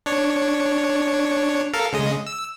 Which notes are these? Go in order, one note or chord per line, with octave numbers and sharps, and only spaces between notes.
D4 C#5
A4 A#4 F5
C#3 G#3 D#5
E6